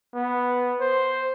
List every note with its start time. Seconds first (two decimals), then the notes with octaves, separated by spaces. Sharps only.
0.15 B3
0.81 C5